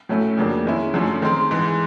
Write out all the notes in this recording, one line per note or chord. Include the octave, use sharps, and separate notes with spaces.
A2 F#3 A3 C#4 E4
F2 C#3 F#3 A#3 D4
D#3 G#3 C#4 E4
F#2 D3 F3 A3 C#4
D#3 G#3 C4
G#2 E3 G#3